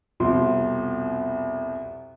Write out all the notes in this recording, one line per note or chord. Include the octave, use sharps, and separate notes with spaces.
C2 F2 B2 C6